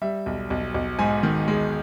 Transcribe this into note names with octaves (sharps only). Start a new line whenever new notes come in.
G3 E5
B1
B1
B1
G#2 G#5
D#3
G#3